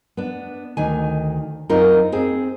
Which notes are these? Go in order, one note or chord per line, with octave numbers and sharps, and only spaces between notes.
B3 D4
D2 D#3 G#5
F#2 C4 D#4 F4 A#4
C4 G#4